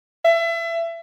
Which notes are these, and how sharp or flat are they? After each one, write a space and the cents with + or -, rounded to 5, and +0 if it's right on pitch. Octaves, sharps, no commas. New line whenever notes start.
E5 +30